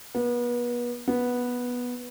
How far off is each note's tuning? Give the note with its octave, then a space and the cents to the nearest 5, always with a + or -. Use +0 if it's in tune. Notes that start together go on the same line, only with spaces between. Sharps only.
B3 -35
B3 -10